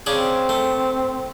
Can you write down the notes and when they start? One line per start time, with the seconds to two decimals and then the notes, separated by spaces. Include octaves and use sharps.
0.06 C#3 C4 D4 G#4
0.49 A3